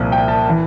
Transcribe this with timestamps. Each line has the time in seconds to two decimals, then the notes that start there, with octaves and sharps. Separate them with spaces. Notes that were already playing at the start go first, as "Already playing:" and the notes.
Already playing: C2 A#2 F3
0.12 G5
0.28 A5
0.49 E3